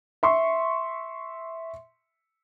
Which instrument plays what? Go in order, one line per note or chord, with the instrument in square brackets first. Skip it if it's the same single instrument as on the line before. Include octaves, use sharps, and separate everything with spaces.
[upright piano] E5 C6 C#6